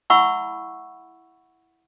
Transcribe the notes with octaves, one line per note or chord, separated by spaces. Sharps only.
E4 E5 F#5 B5 C#6 E6